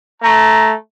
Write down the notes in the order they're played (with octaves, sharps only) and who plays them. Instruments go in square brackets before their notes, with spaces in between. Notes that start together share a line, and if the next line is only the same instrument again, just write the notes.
[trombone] A3 [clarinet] A#5